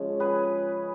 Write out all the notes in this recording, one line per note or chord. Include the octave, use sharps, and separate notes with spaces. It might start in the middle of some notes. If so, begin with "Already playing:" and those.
Already playing: C#3 F3 G#3 C#5
G#4 B4